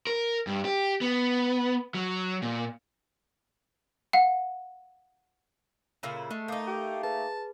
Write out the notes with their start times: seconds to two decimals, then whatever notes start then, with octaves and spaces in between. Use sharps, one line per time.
0.07 A#4
0.47 G2
0.65 G4
1.01 B3
1.94 F#3
2.42 A#2
4.13 F5 F#5
6.03 A#2 C#3 E4
6.31 G#3 A3
6.48 A#3 D#4 D6 D#6 G6
6.67 G4
7.03 G#4 B4 A5